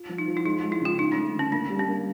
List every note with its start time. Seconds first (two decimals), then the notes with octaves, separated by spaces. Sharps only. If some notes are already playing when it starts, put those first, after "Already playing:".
Already playing: F4
0.09 F3
0.18 D#4
0.28 F3
0.37 E4
0.45 G#3 D#4
0.63 G#3
0.72 E4
0.81 C#3 F4
0.99 C#4 D#4
1.12 D4
1.17 A3
1.35 D3 C#4
1.52 A#3 D4
1.70 G3
1.79 C#4
1.88 A#3